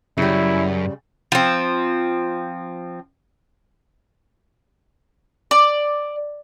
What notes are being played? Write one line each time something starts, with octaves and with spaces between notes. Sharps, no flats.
F#2 C#3 G3 E4
F3 C4
D5